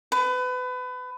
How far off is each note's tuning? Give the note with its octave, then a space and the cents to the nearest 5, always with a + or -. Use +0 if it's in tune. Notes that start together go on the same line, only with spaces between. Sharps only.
B4 +30